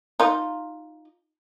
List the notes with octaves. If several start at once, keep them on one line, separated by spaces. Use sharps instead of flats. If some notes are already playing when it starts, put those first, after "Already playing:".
D#4 F4